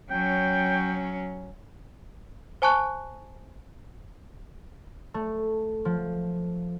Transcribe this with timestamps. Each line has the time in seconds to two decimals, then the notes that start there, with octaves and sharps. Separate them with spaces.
0.11 F#3 C#4 G5
2.62 C5 G#5 A5 C#6 F#6
5.14 A3
5.85 F3